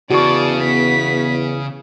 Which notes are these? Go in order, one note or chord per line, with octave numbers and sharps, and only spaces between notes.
E2 C#3 F#4 D5 A5 C#6
B3 B6